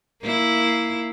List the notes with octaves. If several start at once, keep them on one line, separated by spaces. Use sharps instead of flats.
A#3 E4